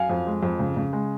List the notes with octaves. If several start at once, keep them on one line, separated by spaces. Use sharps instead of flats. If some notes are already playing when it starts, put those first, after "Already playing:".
Already playing: F#2 F5 G#5
F2
G#3
F2
C#3
C#3
G#3